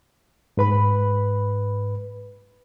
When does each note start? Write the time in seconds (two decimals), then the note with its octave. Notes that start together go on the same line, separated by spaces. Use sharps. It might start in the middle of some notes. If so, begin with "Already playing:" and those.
0.57 G#2 B4 B5